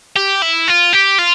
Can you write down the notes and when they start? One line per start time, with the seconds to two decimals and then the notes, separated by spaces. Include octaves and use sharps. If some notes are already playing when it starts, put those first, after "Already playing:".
0.16 G4
0.42 E4
0.68 F4
0.93 G4
1.19 F4